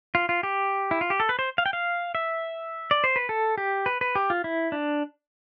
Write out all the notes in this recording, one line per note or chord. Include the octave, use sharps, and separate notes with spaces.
F4
F4
G4
E4
F4
G4
A4
B4
C5
F5
G5
F5
E5
D5
C5
B4
A4
G4
B4
B4
G4
F4
E4
D4